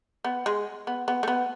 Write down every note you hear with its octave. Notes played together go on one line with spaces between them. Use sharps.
B3
G#3
B3
B3
A3
B3